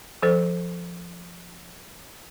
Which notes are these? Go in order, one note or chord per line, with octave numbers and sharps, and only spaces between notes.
F3 A4 C5